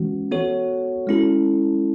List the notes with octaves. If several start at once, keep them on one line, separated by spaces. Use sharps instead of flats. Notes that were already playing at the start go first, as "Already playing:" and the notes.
Already playing: E3 G#3 C#4 F#4
B3 F#4 A4 C#5
G#3 C#4 E4 A4